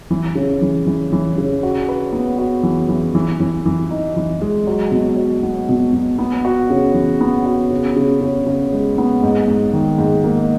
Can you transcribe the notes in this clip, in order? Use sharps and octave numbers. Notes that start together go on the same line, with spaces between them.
E3
C#3
E3
E3
E3
C#3
F#4
B4
B3
F#4
E3
E3
E3
E3
E3
D#4
E3
G#3
F#3
B2
F#3
B3
B2
B2
B3
F#4
C#3
E3
B3
F#4
C#3
C#3
C#3
C#3
G#3
B3
G#2
G#2
D#3
G#2
A#3